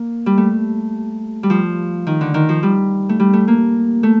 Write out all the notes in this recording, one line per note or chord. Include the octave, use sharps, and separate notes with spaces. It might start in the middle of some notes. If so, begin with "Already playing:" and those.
Already playing: A#3
G3
A3
G3
F3
D#3
D3
D#3
F3
G3
A3
G3
A3
A#3
A3